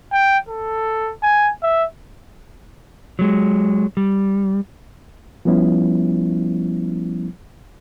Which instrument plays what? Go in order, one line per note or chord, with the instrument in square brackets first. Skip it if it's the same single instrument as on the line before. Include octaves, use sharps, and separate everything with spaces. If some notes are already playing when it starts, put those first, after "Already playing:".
[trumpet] G5
A4
G#5
E5
[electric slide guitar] F#3 G#3
G3
[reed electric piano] F3 G3 B3 C#4 E4